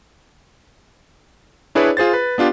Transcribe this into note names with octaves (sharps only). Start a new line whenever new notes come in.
D4 E4 G#4 B4 C#5 D5
F4 G#4 C5 A6
B4
B3 D4 F4 G4